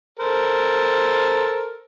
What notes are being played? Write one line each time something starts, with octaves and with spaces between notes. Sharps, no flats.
A4 A#4 C5